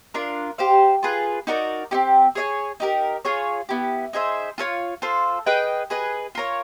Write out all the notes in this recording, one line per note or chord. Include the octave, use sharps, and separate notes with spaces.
D4 F4 A#4
G4 C5 F5
F4 G#4 B4
D#4 F#4 A#4 D5
C4 D#4 G4
G#4 C#5 E5 G#5
D#4 G4 A#4
F4 G#4 C#5
B3 E4 G4
D#4 G#4 C5 E5
F4 A4 C#5 F5
F4 A4 C5
G#4 B4 D#5 G5
G#4 B4 D#5
F4 A#4 C#5